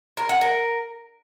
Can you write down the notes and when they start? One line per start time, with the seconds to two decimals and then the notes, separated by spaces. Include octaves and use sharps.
0.17 A#4
0.29 F#5
0.41 A#4